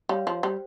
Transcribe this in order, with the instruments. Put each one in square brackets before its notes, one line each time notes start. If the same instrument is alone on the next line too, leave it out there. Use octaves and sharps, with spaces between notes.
[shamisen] G3 [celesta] C#5 F5
[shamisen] F3
[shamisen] G3 [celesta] C5